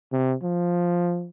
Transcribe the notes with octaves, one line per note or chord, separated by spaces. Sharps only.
C3
F3